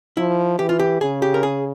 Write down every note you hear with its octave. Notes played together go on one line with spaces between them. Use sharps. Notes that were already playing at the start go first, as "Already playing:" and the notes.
F3 E4
E3 G4
F4
G4
C#3 G#4
G4
A#4
G#4